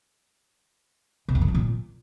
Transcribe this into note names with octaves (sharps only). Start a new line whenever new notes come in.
B2
F2
C#3
F3
A#2